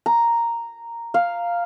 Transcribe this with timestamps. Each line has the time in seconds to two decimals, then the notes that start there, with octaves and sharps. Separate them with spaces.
0.06 A#5
1.14 F5